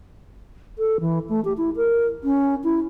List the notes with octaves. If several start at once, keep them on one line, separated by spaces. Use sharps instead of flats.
A4
E3
A3
G4
E4
A#4
C#4
E4